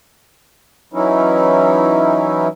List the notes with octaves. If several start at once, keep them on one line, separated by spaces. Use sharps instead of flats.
E3 F#3 C#4 D#4 E4